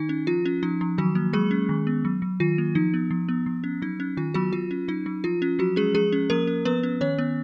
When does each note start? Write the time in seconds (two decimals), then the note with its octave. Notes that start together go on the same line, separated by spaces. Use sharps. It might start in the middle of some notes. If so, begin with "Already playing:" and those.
Already playing: D#3 D#4
0.09 C#4
0.27 F3 F4
0.46 C#4
0.63 F3 D#4
0.81 F3
0.98 D#3 F#3 F#4
1.15 A#3
1.33 F#3 G#3 G#4
1.51 C#4
1.69 D#3
1.87 B3
2.05 F#3
2.22 F#3
2.40 D#3 F4
2.58 A#3
2.75 F3 D#4
2.94 B3
3.11 F3
3.29 B3
3.46 F3
3.64 C#4
3.82 F#3 D#4
4.00 C#4
4.17 D#3 F4
4.34 F#3 B3 F#4
4.52 F#3 F4
4.71 C#4
4.88 F#3 D#4
5.06 F#3
5.24 F3 F4
5.42 C#4
5.59 F3 F#3 F#4
5.76 G#3 C#4 G#4
5.94 F3 G#3 G#4
6.12 C#4
6.30 F3 A#3 A#4
6.47 C#4
6.65 F3 B3 B4
6.83 C#4
7.01 D#3 C#4 C#5
7.18 B3